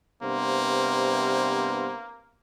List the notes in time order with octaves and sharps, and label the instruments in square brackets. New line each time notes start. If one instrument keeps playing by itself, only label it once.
[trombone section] G2 B3 C5 [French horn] C3 [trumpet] A#3